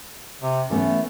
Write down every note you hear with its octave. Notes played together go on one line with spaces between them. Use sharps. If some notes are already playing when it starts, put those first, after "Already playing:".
C3
E3 A3 B3 C#4